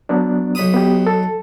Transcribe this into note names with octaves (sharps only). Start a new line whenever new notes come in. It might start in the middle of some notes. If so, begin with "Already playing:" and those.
F#3 B3 D4
B1 B5 D#6
B3 G4
A4